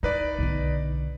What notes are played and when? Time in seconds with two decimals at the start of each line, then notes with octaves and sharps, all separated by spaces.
0.03 D#4 E4 B4 D5
0.39 B1 D3